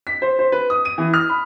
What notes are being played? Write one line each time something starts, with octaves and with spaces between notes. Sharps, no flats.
B6
C5
C5
B4
D#6
D#7
E3
F6
B5